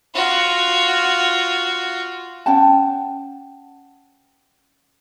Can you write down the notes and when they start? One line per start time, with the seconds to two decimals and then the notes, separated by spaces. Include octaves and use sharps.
0.15 F4 F#4
2.46 C#4 F#5 G5 A5